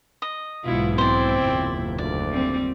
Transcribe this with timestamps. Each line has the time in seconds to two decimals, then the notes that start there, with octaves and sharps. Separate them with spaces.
0.22 D#5
0.64 B1 G#2 B2 E3 B3 E4 F4
0.98 C4 E4 C5 D5
1.39 F#1 D#2 A#2
1.98 D2 D5
2.30 G3 C4